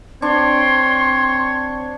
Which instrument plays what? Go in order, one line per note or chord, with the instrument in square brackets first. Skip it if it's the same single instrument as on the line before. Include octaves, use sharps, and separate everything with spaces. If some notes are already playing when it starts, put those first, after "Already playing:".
[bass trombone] C4 [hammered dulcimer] D4 [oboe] C#5 [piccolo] C6